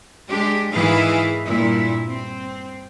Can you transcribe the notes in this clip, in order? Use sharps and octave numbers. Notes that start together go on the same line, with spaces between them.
G#3 D4 G4
G#2 D#3 E3 E4 G#4 F5
G2 A#2 E4
C4